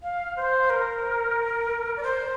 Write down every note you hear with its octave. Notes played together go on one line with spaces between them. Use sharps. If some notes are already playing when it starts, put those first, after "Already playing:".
F5
C5
A#4
D5
C5